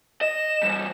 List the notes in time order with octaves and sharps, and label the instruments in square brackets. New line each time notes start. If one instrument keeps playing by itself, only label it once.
[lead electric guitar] D#5 [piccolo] E7
[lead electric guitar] E3 G3